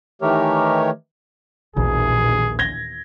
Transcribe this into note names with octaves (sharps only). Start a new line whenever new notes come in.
D#3 E3 A3 G4 A#4 C#5
E1 A#1 D#2 A#2 E3 G#4
G#6 A#6 G7